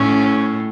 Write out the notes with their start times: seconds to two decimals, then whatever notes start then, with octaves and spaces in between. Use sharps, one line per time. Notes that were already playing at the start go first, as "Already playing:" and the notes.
Already playing: A2 C#4